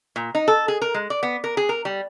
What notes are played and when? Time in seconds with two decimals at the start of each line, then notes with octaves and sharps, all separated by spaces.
0.16 A#2
0.35 D#4
0.48 A4
0.68 G#4
0.82 A#4
0.94 G#3
1.10 D5
1.23 B3
1.44 A#4
1.57 G#4
1.69 A#4
1.85 G3